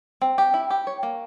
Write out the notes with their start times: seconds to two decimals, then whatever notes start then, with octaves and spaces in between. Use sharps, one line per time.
0.21 C4
0.38 G4
0.54 E4
0.70 G4
0.87 C#5
1.03 A#3